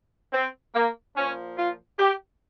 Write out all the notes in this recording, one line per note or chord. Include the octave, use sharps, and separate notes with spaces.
C4
A#3
A#2 F3 C#4
F4
G4